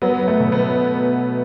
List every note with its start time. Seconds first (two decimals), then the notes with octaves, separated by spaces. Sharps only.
0.02 F#3 B3
0.21 F#3
0.27 A3
0.40 B2
0.52 B3